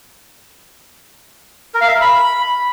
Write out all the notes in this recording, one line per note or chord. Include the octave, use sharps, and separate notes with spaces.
A#4
F5
E5
A#4
B5